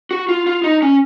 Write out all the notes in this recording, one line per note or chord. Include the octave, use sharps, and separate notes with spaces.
F#4
F4
F4
D#4
C#4